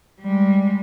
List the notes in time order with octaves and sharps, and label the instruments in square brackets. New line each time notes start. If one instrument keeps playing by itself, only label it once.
[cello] G3 G#3